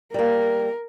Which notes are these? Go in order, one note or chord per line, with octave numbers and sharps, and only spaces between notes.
G3 A#3 A#4